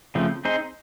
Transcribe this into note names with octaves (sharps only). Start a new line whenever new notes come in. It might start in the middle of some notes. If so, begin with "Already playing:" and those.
C#3 F3 A3 C4
C4 D#4 G#4 C5